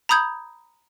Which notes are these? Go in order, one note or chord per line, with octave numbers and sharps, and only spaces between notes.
A#5 B5 D#6 G6 G#6